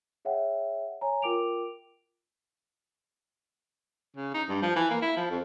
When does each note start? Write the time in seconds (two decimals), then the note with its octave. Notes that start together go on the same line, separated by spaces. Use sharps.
0.25 G#4 C#5 E5 F#5 G5
1.01 C#5 G#5 A#5
1.22 F4 A#4 G5 D6 D7 F7
4.16 C#3
4.34 D#4
4.49 G2
4.62 F3
4.76 E3
4.91 A#3
5.02 E4
5.17 F3
5.31 F2